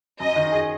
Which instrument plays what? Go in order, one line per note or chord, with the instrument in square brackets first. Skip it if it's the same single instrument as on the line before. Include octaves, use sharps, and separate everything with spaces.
[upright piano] F#2 [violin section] D#5
[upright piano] D#3
G#4